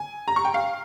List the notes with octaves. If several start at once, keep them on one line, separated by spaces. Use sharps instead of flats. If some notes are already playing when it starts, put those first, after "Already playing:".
Already playing: G#5
A#5
C#6
G5
F5